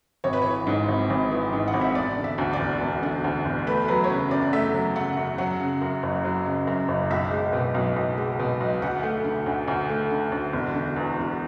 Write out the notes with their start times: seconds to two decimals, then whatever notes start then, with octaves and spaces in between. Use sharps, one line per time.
0.24 G#1 C#5
0.33 B4
0.42 E3 C#5
0.67 G#2
0.88 G#1
1.10 G#1
1.31 E3
1.53 G#2
1.68 F#5
1.74 G#1
1.81 E5
1.95 E1 D5
2.17 D3
2.24 E5
2.38 D2
2.53 D5
2.60 E1
2.81 E1
3.03 D3
3.24 D2
3.45 E1
3.67 A3 B4
3.88 F#3 B4
4.04 C#5
4.10 C#3 B4
4.31 F#2 D5
4.53 A3 E5
4.74 F#3
4.96 C#3 F#5
5.17 F#2
5.38 F#3 F#5
5.60 C#3
5.81 F#2
6.03 F#1
6.24 F#3
6.46 C#3
6.67 F#2
6.88 F#1
7.10 B1 E5
7.31 G#3
7.53 B2
7.74 B1
7.96 B1
8.17 G#3
8.39 B2
8.60 B1
8.82 D2 F#5
9.03 A3
9.24 D3
9.46 D2
9.68 D2
9.89 A3
10.10 D3
10.32 D2
10.53 E1
10.74 D3
10.96 E2
11.18 E1